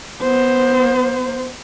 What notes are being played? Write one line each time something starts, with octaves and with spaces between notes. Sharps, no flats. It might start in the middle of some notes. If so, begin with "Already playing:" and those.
B3 C5